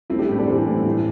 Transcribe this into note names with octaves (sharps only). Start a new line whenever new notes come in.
A3 C4 E4
D4 G4
A2
A4 D5
E3 G4 C5
A2
A2 E4
D4